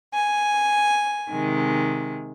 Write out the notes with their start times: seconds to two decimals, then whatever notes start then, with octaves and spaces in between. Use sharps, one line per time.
0.13 G#5
1.30 C3 D#3 G#3